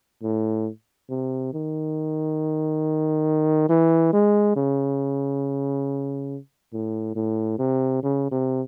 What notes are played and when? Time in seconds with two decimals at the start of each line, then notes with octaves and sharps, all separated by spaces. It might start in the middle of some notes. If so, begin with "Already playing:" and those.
0.23 A2
1.10 C3
1.53 D#3
3.69 E3
4.13 G#3
4.56 C#3
6.73 A2
7.16 A2
7.59 C3
8.03 C#3
8.32 C3